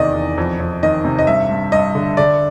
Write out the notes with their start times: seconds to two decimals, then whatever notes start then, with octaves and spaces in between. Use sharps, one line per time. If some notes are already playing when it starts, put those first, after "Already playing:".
Already playing: E2 C3 D#3 D5 D#5
0.14 E2
0.37 F2
0.59 F2
0.83 D#3 D#5
1.05 C3
1.19 D#5
1.27 G2 E5
1.51 G2
1.72 G2 D#5
1.95 D3
2.17 D3 D5